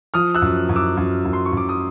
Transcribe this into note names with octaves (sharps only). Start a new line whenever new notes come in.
F3 D#6 F6
E6 F#6
F#2
F#2
D6 E6
F#2
F#2
C6
C#6
F#2 D6
D#6